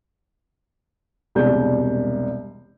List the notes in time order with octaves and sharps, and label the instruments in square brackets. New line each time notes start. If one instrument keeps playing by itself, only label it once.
[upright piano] E1 C2 B2 G3 G#3 G6